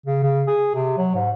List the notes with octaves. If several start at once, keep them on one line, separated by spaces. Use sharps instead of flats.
C#3
C#3
G#4
C3
F#3
G#2